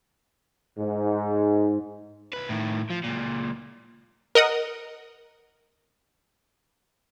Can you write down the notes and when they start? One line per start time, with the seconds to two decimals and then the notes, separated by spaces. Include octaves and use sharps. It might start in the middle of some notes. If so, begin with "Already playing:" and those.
0.78 G#2
2.33 C2 B4
2.49 A2 D#3
2.90 F3
3.04 C#2 A#2
4.35 A#4 D#5 F#5 D#6